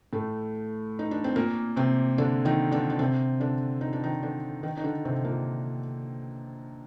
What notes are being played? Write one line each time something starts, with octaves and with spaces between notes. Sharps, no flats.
A2 A3
D#4
D4
C4
A#2 A#3
C3 C4
D3 D4
D#3 D#4
D3 D4
D4
C3 C4
D3 D4
D#4
D4
D#3 D#4
D3 D4
D#3 D#4
D#4
D3 D4
C3 C4
A#2 A#3